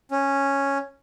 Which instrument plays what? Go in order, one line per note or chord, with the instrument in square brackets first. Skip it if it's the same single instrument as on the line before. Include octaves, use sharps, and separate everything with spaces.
[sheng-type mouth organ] C#4